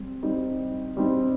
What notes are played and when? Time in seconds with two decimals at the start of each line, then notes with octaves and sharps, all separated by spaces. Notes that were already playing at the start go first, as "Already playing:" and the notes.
Already playing: G3 C4
0.22 G3 C4 D#4
0.97 G3 C4 D#4